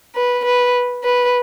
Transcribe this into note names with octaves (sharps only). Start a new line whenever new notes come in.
B4
B4
B4